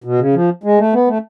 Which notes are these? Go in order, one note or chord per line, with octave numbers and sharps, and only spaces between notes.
B2
C#3
F3
G#3
A3
B3
A3